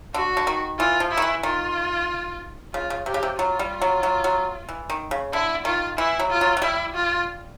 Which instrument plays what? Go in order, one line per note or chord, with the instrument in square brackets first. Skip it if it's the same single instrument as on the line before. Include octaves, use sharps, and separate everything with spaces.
[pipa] D3 [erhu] F#4
[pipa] D3
D#3
[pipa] E3 [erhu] F4
[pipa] F3
[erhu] E4
[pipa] D#3
E3
[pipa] D#3 [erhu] F4
[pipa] C#3 [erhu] F4
[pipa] C#3
[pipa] C3 [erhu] G4
[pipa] C#3
C3
[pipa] F#3 [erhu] F4
[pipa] G3
F#3
F#3
F#3
E3
D#3
C#3
[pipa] D3 [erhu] E4
[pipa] D#3 [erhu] F4
[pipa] E3 [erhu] E4
[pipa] F#3
[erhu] F4
[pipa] F#3
F#3
[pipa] G3 [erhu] E4
[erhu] F4